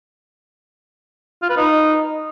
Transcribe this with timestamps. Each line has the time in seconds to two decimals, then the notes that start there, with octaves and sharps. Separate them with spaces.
1.42 F4
1.49 B4
1.57 D#4